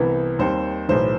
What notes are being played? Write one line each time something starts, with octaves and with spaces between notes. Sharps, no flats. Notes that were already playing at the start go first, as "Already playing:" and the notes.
Already playing: C2 C3 E3 B3
D#2 D#3 G3 C4 C5
B1 A2 E3 C5